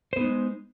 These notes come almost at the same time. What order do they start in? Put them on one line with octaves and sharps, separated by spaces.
C5 B3 D#4 G#3